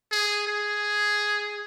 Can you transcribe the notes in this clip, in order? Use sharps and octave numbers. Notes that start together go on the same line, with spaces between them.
G#4
G#4